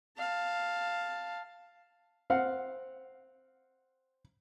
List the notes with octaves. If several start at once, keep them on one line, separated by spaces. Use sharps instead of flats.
F5 A5
C4 F5 F#5